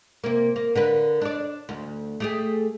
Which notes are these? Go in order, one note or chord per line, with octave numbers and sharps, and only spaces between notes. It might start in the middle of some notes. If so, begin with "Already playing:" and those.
C3 A#3
A#3
D3 A#4 B4
D4 D5
D2
A3 G4 G#4